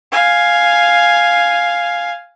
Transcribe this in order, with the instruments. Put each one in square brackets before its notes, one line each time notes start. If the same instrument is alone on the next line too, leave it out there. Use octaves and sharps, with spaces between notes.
[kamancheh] F5 G#5